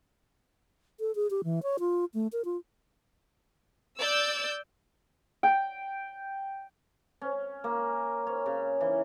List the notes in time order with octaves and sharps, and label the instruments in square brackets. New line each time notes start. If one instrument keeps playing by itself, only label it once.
[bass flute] A4
G#4
G4
E3
C#5
F4
A3
A#4
F4
[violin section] D5 E6 G6
[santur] G5
[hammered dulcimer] C#4
A#3
C#5
C#3
E3